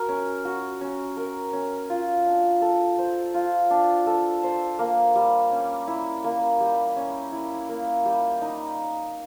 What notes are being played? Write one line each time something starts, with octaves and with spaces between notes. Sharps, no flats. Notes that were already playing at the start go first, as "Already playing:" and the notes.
Already playing: F#4 A#4
C#4
F#4
C#4
A#4
C#4
F4
D4
A4
C5
F4
D4
A4
C5
A#3
G3
C#4
E4
A#3
G3
C#4
E4
A#3
G3
D#4